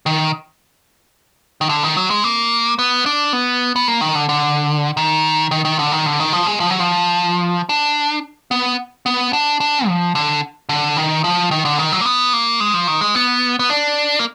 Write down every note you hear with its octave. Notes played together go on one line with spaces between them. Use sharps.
D#3
D#3
D3
D#3
F#3
G#3
A#3
B3
D4
B3
B3
A#3
D#3
D3
D3
D#3
D#3
D#3
D3
D#3
D3
D#3
F3
G#3
F3
F#3
F3
D4
B3
B3
D4
D4
F3
D3
D3
D#3
F3
D#3
D3
D#3
F#3
A#3
B3
A#3
G#3
F3
D#3
G#3
B3
B3
D4
A#3